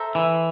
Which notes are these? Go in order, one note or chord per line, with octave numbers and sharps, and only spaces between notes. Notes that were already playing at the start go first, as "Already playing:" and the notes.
Already playing: A4 C5 E5 A#5
E3